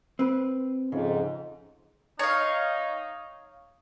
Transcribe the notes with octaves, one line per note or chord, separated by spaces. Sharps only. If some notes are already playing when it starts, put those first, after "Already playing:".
C4 B4
F2 G#2 C#3
D#4 C#5 F5